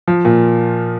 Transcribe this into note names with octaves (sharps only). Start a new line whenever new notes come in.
F3
A#2